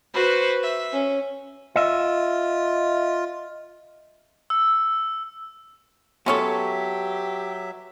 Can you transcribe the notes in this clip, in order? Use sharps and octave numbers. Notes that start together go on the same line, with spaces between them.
F#4 B4 C5
E5
C#4
F4 D#5 E5
E6
F#3 G#3 B3 C#4 G4 A4 C#5 E5